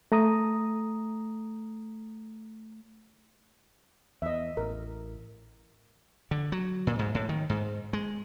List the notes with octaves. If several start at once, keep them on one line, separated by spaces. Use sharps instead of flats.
A3 A#5 D#6
E2 D#5 E5
A1 A#4
D3
F#3
A#2
G#2
A2
D#3
G#2
G#3